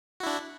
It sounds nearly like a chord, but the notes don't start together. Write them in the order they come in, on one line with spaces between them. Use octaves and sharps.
F#4 E4 D4